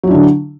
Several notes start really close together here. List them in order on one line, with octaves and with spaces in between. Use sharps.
F#3 E4 D4 D3